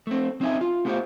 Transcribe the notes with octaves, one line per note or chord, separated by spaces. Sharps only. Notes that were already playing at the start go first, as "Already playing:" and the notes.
A3 C4
C4 C#4 D#4 E5 G#5
F4
A3 B3 F4 G4 C5 F5